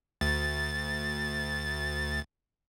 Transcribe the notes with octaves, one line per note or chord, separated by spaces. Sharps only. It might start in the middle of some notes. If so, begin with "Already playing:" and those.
D2 A6